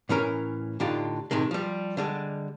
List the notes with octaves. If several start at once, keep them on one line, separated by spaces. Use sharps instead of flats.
A2 E3 C#4 A#4
A2 D3 D4 D#4 F4 G4
A2 C3 D#3 G#3
F3 G3
D3 G3 G#3